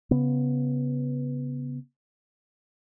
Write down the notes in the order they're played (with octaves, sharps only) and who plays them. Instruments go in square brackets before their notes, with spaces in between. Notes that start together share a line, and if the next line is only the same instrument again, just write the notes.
[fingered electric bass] C#3 B3